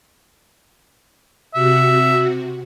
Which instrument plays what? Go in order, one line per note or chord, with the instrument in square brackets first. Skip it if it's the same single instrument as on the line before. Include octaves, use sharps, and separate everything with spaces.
[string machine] C3 F#4 [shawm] E5